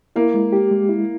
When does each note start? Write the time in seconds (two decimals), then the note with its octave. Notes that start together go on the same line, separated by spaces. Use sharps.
0.16 A#3 E4
0.34 G#3
0.53 G4
0.71 G#3
0.89 E4